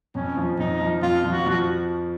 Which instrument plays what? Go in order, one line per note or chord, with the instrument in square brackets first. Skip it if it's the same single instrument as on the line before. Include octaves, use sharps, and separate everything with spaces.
[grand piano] F2 [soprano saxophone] C#4
[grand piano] F3
[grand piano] F2 [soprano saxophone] D#4
[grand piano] F3
[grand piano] F2 [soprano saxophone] F4
[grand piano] F3
[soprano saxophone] F#4
[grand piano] F3 [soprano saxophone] F#4